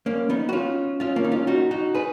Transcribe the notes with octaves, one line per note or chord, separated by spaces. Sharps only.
A#3 C#4
B3 D#4
F#4
C#4 F4
C#4 F4
A#3 C#4
D#4
C#4 F4
D#4 F#4
D#4 F#4
G#4 B4